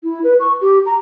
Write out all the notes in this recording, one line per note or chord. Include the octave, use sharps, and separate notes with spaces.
E4
B4
C#6
G4
A#5